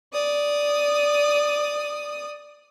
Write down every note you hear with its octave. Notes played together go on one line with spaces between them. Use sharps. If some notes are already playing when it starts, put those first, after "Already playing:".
D5 D#6